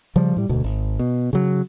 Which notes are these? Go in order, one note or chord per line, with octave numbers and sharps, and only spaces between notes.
C#3 F3 G3
A2 G3
E1 D2 B2
G#1
B2
C#3 F#3